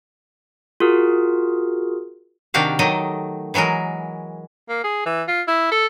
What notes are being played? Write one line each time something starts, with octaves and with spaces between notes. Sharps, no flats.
F4 F#4 G#4 A#4
C3 D#3 D4 F#4 G4 F5
D#3 F#3 A3 G4 A4 D#5
E3 F#3 G#3 F#4 A#4
A#3
G#4
E3
F4
E4
A4